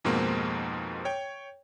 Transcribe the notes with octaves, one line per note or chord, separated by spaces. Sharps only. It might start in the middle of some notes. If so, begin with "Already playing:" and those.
F2 G#2 B2 G#3 A#3 C4
C#5 G5